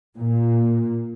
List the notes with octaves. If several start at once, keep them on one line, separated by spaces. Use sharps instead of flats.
A#2